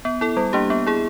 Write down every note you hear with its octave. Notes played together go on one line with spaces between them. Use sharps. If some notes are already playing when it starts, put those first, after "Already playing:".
B3
E4 A4
G3
A#3 D4 G4
B3
E4 G#4